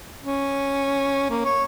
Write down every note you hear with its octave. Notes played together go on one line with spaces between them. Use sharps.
C#4
A#3
C#5